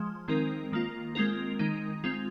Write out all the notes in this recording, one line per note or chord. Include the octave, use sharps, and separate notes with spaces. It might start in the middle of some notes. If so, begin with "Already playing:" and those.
Already playing: F3 G#3
D#3 G#3 C4 D#4 A#4
D#3 A#3 F4
G#3 C4 F4 A#4
D#3 G#3 D#4
G#3 C4 F4